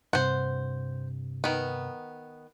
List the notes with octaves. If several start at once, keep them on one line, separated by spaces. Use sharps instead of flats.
G2 C3 C5 F#5
D#3 B3